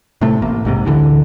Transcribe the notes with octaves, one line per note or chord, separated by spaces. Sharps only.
A2 C3 A3
A1 A#3
A#1 G#2 C3
D2 D3 E3